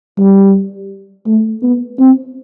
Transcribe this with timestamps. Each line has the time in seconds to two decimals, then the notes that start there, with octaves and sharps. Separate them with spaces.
0.19 G3
1.27 A3
1.62 B3
1.99 C4